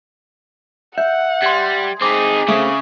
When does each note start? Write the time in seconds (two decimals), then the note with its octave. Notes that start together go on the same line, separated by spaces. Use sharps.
0.98 E5 F#5 G6
1.42 G3 C6 G#6
2.02 C4 D#4 G#4 D6 B6
2.48 C#3 A3 C4 E5 F5